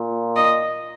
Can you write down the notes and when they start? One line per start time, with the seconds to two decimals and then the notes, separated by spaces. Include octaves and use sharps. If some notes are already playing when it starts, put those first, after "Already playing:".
Already playing: A#2
0.36 D#5